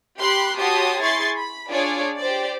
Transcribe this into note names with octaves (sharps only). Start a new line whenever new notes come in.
G4 B5 C6 F#6
F#4 G4 C#5 A5 C6 D#6
E4 G#4 C6 C#6 A6
B5
D4 F4 G#4 C#5 D5
G4 C5 D5